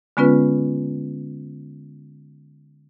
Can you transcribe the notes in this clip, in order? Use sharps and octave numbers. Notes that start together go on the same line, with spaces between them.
D3 G#3 B3 C#4 F4 B4